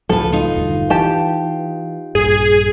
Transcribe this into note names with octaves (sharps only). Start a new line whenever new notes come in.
C#2 A2 F3 F#3 A4 B4
D#4 F4
E1 D2 G2
E3 G4 A5
A#1 G2 G#4